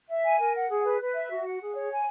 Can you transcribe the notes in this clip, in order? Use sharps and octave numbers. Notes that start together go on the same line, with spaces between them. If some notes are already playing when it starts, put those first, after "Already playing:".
E5
G#5
A#4
F#5
G#4
B4
B4
E5
F#4
F#5
G#4
C#5
G#5